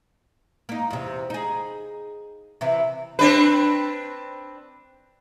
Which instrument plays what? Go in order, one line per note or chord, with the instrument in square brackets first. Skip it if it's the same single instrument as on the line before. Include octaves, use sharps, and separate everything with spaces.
[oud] A#3 D#4
E2 C3
D#4 G#4
C3 E3 E4
[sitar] C4 D4 B4